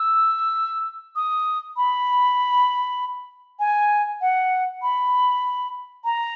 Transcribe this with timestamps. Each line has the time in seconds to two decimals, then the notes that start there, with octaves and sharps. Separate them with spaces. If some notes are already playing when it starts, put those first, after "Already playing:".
Already playing: E6
1.16 D#6
1.77 B5
3.60 G#5
4.21 F#5
4.82 B5
6.05 A#5